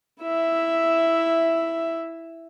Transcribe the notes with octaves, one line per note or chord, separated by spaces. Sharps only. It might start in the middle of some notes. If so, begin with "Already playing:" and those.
E4 E5